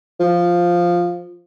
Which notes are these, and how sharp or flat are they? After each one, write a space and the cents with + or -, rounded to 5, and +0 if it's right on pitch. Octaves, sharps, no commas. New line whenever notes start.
F3 +0